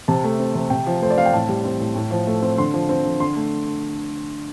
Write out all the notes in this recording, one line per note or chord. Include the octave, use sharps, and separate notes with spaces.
C3 A5
A3
C4
C3
C3 G5
F3
A3 C5
D5
C4 F5
G5
A2 A5
G3
C4
A2
A2
F3
A3
C4
D3 C6
F3
C4
D3
D3 C6
A3